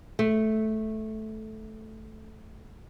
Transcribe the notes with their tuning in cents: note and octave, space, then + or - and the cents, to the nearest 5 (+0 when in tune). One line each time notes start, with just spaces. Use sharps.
A3 -10